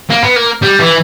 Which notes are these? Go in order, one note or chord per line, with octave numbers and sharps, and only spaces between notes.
A#3
B3
A#3
G3
E3